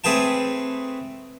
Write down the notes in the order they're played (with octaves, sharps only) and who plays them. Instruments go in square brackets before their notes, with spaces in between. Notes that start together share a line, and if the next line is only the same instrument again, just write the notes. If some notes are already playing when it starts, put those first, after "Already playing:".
[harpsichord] A3 C4 G#4 B4 G5 A5